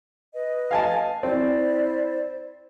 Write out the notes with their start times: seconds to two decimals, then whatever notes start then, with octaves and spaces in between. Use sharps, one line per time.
0.33 B4 D#5
0.71 F5 G#5 A5
1.23 C4 E4 C5 D5